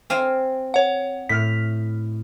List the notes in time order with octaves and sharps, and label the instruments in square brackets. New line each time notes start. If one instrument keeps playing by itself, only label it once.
[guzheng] C4 F5 G#5
[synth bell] C#5 F#5
[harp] A2 F6 [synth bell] B6